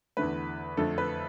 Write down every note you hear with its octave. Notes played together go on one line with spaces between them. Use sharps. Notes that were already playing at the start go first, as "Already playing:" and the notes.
E2 D3 A3 B4
F2 D3 A3 A4
B4